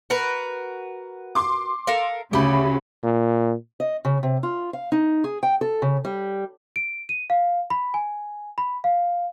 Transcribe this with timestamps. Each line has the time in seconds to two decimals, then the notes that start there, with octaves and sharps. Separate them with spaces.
0.10 F#4 A#4 B4
1.35 C6 D6
1.87 A4 A#4 F5
2.33 D2 C#3 G4 B5
3.03 A#2
3.80 D#5
4.05 C#3
4.23 C3
4.43 F4
4.73 F5
4.92 D#4
5.24 G#4
5.43 G5
5.61 A4
5.82 C#3
6.05 G3
6.76 D7
7.09 D#7
7.30 F5
7.70 B5
7.94 G#5
8.58 B5
8.84 F5